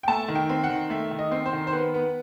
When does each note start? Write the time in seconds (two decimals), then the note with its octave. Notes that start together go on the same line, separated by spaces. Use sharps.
0.03 G5
0.08 A3 A5
0.28 D#3
0.35 G5
0.49 C4
0.64 F#5
0.69 D#3
0.90 A3 E5
1.11 D#3
1.19 D#5
1.31 C4
1.46 C5
1.53 D#3
1.67 C5
1.72 B3 B4
1.94 B3